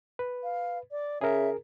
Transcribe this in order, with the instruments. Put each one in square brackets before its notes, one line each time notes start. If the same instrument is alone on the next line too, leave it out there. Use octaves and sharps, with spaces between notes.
[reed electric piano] B4
[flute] F5
D5
[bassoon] C#3 [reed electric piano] G#4 A#4 [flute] E5